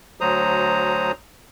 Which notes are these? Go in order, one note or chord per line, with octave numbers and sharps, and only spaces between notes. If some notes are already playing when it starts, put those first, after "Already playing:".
D2 F#3 C5 A#5 D#6